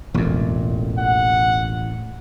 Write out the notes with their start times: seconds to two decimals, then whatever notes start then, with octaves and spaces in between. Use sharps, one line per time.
0.14 E1 A1 F2 A#2
0.99 F#5